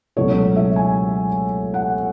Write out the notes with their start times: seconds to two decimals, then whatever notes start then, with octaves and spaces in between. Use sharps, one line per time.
0.16 C#2 B2 F#3 A3 E4 C#5
0.56 E5
0.76 G#5
1.74 F#5